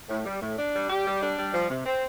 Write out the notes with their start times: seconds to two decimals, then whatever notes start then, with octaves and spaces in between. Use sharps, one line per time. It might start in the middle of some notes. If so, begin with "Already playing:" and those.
0.09 A2
0.25 G3
0.41 A2
0.57 D4
0.73 G3
0.89 G4
1.05 G3
1.21 D4
1.38 G3
1.54 F3
1.69 C3
1.86 C4